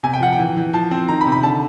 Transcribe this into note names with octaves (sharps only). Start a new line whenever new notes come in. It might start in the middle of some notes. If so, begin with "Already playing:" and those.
C3 G#5
G5
F3 F#5
G5
E3
E3
F3 A5
C4
D#3 A#5
B5
C3
B5
D3 A5